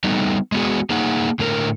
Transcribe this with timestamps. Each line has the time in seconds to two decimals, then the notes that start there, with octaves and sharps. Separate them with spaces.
0.04 G3 A3 B3 D#4
0.52 G#3 B3 F#4 G#4
0.90 A#3 D#4 G#4 F#5
1.39 A2 D3 A3 A#4